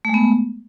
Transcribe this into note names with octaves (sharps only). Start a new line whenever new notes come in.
G#3 A3 B3